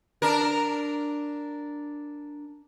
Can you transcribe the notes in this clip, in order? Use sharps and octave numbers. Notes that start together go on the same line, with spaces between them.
D4 A#4